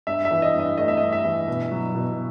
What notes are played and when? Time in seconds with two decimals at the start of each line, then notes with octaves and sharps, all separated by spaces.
0.07 G2 E5
0.25 E5
0.31 E3
0.42 D#5
0.54 G2
0.60 D#5
0.77 A3 D#5
0.88 E5
0.97 G2 D#5
1.12 E5
1.25 E3
1.47 B2
1.71 F#3
1.95 B2